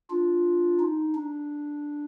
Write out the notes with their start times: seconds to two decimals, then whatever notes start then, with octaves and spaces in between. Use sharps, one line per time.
0.10 D4 F4
0.80 D#4
1.15 D4